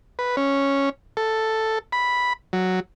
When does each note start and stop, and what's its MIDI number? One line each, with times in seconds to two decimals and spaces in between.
0.19 0.36 71
0.37 0.89 61
1.17 1.79 69
1.92 2.33 83
2.53 2.80 54